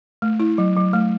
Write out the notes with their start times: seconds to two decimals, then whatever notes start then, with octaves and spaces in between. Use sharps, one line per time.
0.22 A3
0.40 E4
0.58 F#3
0.76 F#3
0.93 A3